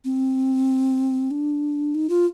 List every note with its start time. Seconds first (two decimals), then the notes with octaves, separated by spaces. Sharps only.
0.05 C4
1.31 D4
1.95 D#4
2.09 F4